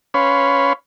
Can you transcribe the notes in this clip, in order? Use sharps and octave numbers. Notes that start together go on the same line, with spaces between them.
C#4 B4 C#5 F5 B5 C6